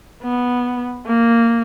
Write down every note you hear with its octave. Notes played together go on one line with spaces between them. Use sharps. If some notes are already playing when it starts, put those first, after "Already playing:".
B3
A#3